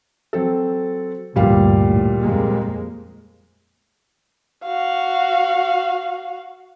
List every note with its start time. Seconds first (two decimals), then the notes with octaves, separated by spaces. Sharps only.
0.33 F#3 C4 A4
1.36 D2 G2 A#2 G3 F5
1.90 A2
2.20 F2 G#3 A#3
4.65 F#4 F5